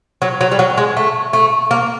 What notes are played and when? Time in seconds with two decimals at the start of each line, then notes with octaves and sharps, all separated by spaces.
0.22 F#3
0.41 F#3
0.52 G3
0.59 F#3
0.77 G#3
0.97 A3
1.33 A3
1.71 A#3